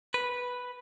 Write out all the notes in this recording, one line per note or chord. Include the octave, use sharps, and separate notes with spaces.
B4